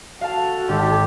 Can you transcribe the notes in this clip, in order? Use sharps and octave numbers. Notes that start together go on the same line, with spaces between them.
F#4 A4 F5 A5
G#1 G4